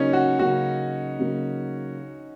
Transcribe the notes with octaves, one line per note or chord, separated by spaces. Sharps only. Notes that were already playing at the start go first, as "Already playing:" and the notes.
Already playing: C#3 F#3 A#3 C#4 D#4
F#4
C#3 F#3 A#3 F#4
C#3 F#3 A#3